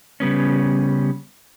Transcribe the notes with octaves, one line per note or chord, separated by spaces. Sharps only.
C#3 G3 B3 C#4